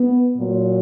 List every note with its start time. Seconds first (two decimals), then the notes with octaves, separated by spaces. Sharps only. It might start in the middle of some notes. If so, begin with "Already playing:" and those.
Already playing: B3
0.37 A#2 F#3